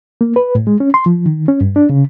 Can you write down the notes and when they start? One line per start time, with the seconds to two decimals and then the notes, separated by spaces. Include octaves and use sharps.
0.21 A#3
0.36 B4
0.55 A2
0.67 G#3
0.80 C#4
0.94 C6
1.06 F3
1.26 D#3
1.48 C#4
1.61 G2
1.76 D4
1.90 C#3